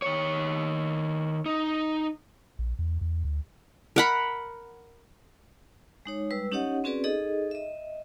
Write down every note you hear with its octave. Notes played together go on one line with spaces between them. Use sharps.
D#3 C#5
D#4
A#1
E2
E2
D2
A#4 F#5 B5
G#3 D#4 C#5
G3 G#3 B4 E6
C#4 D#4 G4 C#5 D#5 F#5
C4 C#4 F#4 G#4 B4 D5
D#4 G#4 A4 D#5
D#5 E5